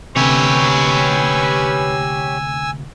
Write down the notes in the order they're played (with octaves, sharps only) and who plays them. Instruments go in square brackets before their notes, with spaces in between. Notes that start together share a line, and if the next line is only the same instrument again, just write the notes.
[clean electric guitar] D2 C3 [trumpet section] C#4 B4 [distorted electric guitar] G4 C#5 [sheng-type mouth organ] G#5 E6